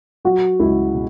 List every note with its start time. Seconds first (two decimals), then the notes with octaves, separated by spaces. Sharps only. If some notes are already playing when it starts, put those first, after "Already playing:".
0.25 F#3 F#4
0.60 C#2 E4
0.94 B2